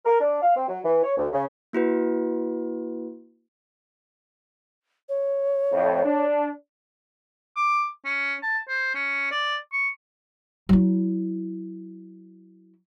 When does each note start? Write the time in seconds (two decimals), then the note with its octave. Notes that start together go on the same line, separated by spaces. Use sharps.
0.05 A#4
0.20 D4
0.41 F5
0.55 C4
0.68 F#3
0.84 E3
1.03 C#5
1.17 D2
1.32 C#3
1.73 A#3 E4 F#4 B4
5.09 C#5
5.73 F2 A2
6.05 D4
7.56 D6
8.05 C#4
8.43 A5
8.68 C5
8.95 C#4
9.31 D5
9.73 C#6
10.69 F#3 E4